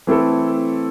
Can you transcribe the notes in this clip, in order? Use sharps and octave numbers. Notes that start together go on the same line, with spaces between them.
E3 A3 C4 E4 A4